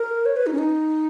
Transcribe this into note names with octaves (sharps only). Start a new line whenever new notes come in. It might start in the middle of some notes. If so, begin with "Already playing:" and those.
Already playing: A#4
C#5
B4
D#4
C#4
D#4